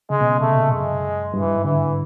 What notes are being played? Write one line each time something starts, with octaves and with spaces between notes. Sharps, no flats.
C#3 G#3
B2
C#3
C3 A3
A#2
F#2 G#3
G2 E3
G2
G#2
D3 E3